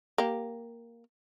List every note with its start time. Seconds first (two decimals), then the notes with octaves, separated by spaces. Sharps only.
0.18 A#3 G4